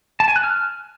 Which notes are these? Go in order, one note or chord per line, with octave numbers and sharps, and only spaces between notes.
A5
G#5
F#6
F6